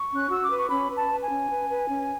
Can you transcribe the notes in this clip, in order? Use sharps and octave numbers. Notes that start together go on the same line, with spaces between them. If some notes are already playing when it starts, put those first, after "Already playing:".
Already playing: C#6
C#4
F#6
F#4 E6
D6
B4
C#6
C#4 B5
B4
A5
B4
G#5
C#4
B4
B4
C#4